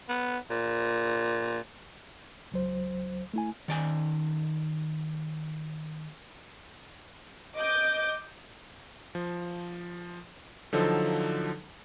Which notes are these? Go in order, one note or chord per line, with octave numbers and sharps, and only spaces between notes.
B3
A#2
C#2 F#3 C5
A3 E4 G#5
D#3 D5 G#5
D#5 D6 G6
F3
D3 F3 F#3 D#4 A4